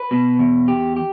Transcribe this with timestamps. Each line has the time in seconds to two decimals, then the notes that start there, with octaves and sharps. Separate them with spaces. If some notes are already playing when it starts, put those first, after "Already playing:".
Already playing: B4
0.11 B2
0.39 E2
0.68 G4
0.96 G4